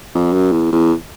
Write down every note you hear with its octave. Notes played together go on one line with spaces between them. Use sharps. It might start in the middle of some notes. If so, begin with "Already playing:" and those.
F2
F#2
E2
E2